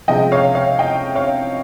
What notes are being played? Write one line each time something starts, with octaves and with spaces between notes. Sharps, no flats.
C#2 C3 F3 G#3 D#5 G5
C#5 F5
C#5 F5
D#5 G5
C#5 F5